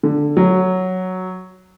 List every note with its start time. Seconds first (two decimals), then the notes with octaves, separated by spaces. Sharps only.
0.03 D3
0.37 F#3